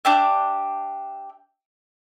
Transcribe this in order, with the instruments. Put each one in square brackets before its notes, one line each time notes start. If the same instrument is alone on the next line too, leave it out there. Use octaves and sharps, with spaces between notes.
[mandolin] D4 G4 E5